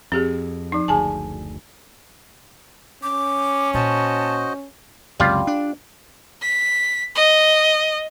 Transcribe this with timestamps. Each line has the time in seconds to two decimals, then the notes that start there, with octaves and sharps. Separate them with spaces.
0.12 F2 C4 G4 G#4
0.72 F3 D#4
0.88 F#1 D2 G#4 G#5 A5
3.03 C#4 D6
3.74 A#2 F#4 C5 D#5 A5
5.20 C#2 F#2 C3 G3 F4 F5
5.47 D4
6.42 B6
7.15 D#5